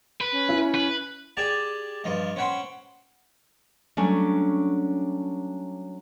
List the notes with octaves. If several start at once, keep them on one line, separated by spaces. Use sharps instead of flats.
B4
C#4
E4
B4
G4 G#4 D5 G#5 A5
G2 F3 D#5
C#4 C5 F#5 G5 B5 C6
F#3 G3 A3 C#4 D4